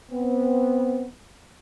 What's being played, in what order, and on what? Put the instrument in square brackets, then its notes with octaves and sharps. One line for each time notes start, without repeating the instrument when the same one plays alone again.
[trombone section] B3 C4